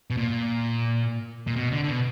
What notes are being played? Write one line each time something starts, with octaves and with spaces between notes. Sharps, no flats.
B2
A#2
A#2
B2
D3
D3
B2